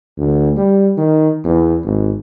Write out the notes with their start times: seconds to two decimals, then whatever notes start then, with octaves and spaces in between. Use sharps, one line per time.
0.18 D2
0.57 G3
0.97 D#3
1.44 E2
1.84 G#1